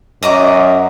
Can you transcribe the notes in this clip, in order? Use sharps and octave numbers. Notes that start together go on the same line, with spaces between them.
F#2 D#5 A#5 D6